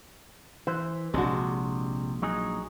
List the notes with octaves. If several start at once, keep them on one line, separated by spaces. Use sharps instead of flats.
E3 C5
A#1 C3 G#3 D4 F#4
F#3 D#4 G#4